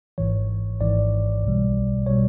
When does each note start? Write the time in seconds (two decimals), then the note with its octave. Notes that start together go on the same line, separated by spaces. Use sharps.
0.18 G#1 G#2 E3 C#5
0.81 G#1 G#2 E3 D5
1.43 B1 B2 G3
2.06 B2 G3 C#5